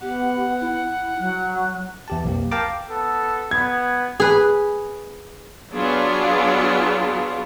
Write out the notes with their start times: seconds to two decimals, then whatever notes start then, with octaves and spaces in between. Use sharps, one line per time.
0.02 B3 G4 F#5
0.61 E4
1.19 F#3 F#6
2.08 E2 G4 A5
2.24 B1 F2 A#3 G4
2.52 A#4 F5 G5 A5 A#5 D6
2.90 B3 A4
3.51 B3 G#6
4.20 G#4 B4
5.72 F#3 B3 D4 F4 G#4